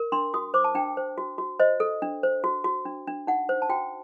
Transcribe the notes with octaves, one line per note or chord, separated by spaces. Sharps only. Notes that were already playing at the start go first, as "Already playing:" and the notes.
Already playing: A#4
D4 C6
F#4 D#6
C5 D6
A5
D4 G5
C5
F#4
F#4
C5 D#5
A4
D4
C5
F#4
F#4
D4
D4
D#4 F#5
C5
A5
F#4 G5